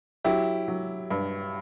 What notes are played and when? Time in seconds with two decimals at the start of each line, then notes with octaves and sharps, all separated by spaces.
0.24 F#3 E4 G4
0.68 F#3
1.10 G2